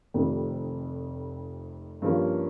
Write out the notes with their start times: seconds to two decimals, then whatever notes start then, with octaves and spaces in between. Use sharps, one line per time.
0.14 F1 F2 C3 D#3
2.02 G2 F3 A#3 C#4